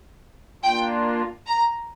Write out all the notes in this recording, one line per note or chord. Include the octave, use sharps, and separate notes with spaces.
A#3 D4 F4 G5
A#5